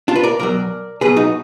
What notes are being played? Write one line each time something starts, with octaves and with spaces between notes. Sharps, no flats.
D4 F4
B4
A#4 D5
B1 B2 F#3 A#4 D5
B1 B2 F#3 G#4 B4
D#4 F#4